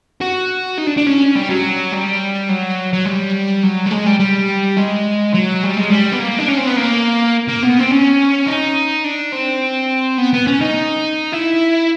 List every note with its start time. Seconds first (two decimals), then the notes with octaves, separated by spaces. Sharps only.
0.21 F#4
0.78 D#4
0.87 D4
0.97 D4
1.06 C#4
1.35 G3
1.49 F#3
1.92 G3
2.49 F#3
2.93 F#3
3.06 G3
3.63 F#3
3.86 G3
3.91 G#3
4.06 G3
4.19 G3
4.77 G#3
5.33 F#3
5.63 G3
5.77 G#3
5.90 G3
6.12 B3
6.20 A#3
6.39 D4
6.48 C#4
6.57 C4
6.67 B3
6.77 A#3
7.48 A#3
7.63 B3
7.79 C4
7.91 C#4
8.47 D#4
9.04 D4
9.32 C4
10.18 B3
10.33 B3
10.47 C#4
10.61 D#4
11.33 E4